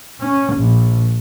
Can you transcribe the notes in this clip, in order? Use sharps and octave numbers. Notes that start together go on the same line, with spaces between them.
C#4
A#1